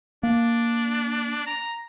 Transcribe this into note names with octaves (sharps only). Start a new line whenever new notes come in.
A#3 D4
A#5